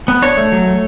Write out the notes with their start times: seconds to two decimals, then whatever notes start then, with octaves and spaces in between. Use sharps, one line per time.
0.08 B3
0.22 D4 C#5
0.37 A3
0.52 F#3
0.67 A3